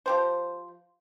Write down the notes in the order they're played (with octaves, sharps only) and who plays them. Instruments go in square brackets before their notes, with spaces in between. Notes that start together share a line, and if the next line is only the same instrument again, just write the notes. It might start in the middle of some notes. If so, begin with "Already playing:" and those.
[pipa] F3 G4 C5